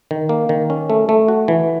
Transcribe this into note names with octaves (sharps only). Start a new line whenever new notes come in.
D#3
A#3
D#3
C#4
A3
A3
F#4
E3